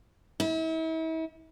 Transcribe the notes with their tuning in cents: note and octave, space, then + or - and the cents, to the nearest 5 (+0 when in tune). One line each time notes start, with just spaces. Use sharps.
E4 -40